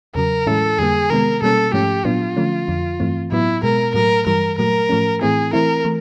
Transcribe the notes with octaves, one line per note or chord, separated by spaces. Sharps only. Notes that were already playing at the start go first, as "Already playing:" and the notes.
E2 C#3 F#3 A#4
A2 E3 G#3 C#4 E4 A4
F2 D3 G3 A#3 G#4
C3 D#3 G#3 B3 A#4
B2 G3 A#3 C#4 A4
G#2 F3 A3 C#4 G4
A#2 F#3 B3 D4 F4
D3 F3 A3 C#4
F2 D3 F3
G2 E3 A3 C4
A2 F#3 B3 E4
B2 G#3 B3 A#4
A2 F#3 A3 A#4
G2 E3 G3 A#4
A#2 F#3 A3 A#4
A2 F3 A3 C#4
A2 E3 A3 C4 E4 G#4
E3 A3 C4 E4 A#4
E3 A3